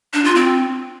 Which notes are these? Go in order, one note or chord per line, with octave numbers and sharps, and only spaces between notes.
D4
F4
C4